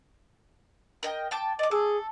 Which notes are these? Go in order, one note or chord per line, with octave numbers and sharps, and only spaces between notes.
A#4 D#5 G5
G5 A5 D6
D5 D#5 D6
G#4 A4